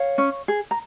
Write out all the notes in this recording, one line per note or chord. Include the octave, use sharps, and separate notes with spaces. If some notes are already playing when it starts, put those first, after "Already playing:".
Already playing: C#5 F5
C#4
G#4
A#5